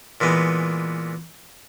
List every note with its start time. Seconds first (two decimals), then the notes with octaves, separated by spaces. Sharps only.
0.21 A#2 E3 G#3 B3